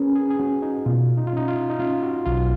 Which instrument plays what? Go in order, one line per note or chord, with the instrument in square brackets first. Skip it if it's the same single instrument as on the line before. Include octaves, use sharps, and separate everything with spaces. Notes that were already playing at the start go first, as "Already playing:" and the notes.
Already playing: [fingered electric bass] C#4 [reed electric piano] G#4 A#4 B4
[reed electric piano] G#4
G#4
[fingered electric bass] C#4 [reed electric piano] F#4
[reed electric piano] D#4
[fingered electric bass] B2 [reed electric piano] F4
[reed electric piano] D#4
F4
[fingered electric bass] C#4 [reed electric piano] D#4
[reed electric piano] F4
D#4
[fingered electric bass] C#4 [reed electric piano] F4
[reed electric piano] F#4
[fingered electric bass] B1 [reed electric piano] F4